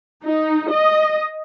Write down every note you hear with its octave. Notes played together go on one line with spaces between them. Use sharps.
D#4
D#5